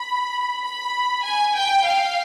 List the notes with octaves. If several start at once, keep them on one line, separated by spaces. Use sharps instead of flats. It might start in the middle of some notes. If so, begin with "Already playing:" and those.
Already playing: B5
B5
G#5
G5
F5